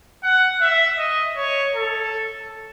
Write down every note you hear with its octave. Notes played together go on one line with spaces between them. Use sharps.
F#5
E5
D#5
C#5
A4